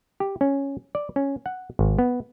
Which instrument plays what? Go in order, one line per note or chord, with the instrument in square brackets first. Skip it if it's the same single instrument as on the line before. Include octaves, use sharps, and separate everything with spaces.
[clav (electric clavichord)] G4
C#4
D5
C#4
F#5
G#1
B3